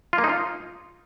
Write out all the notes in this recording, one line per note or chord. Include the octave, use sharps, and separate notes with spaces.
F4
A#3
D#4
F4